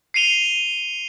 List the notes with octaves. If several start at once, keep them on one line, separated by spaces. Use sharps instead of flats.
C7 C#7 D#7 F7 G7